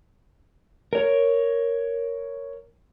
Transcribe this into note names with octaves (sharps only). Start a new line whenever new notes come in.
A#4 C#5